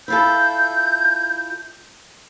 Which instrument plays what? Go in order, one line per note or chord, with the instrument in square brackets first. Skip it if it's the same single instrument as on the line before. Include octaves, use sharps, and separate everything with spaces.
[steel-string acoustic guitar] E4 F4 A4 [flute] G6